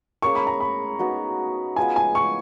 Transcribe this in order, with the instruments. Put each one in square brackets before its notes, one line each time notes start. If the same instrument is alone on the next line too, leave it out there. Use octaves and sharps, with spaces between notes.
[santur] A#3 C#4 G#4 [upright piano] C#6
[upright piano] B5
A#5
B5
[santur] B3 D#4 F#4
[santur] B3 F4 G#4 D#5 [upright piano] G#5
[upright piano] G#5
C#6